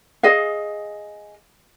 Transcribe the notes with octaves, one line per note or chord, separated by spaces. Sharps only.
G#4 D#5 F5